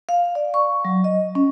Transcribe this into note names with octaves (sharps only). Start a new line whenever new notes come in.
F5
D5
C#6
F#3
D#5
C#4